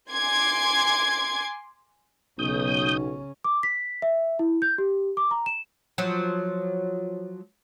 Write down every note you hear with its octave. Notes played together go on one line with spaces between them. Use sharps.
G#5 C6 D6 G#6
B1 C#3 C#4 D#6 G6
D6
B6
E5
E4
G6
G4
D6
A#5
E7
F3 F#3